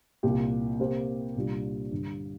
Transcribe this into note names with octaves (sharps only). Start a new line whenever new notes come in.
C2 A#2 A#3 G4
C3 A#3 G4 C5
C2 A#2 G3 D4 F4
G2 D3 G3